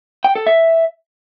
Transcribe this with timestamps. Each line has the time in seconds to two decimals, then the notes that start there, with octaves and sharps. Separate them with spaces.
0.24 G5
0.35 A4
0.46 E5